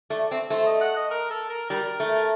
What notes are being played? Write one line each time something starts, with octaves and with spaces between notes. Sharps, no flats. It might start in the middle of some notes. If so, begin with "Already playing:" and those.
A3 D5
C4
A3 C5
D#5
F#5
D#5
A#4
A4
A#4
G3 A#4
A3